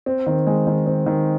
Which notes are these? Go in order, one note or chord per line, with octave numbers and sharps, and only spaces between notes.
C4
D#3
G#3
D#3
C4
D#3